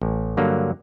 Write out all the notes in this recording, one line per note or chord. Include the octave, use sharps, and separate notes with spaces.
A1
G2 D3 F#3 A#3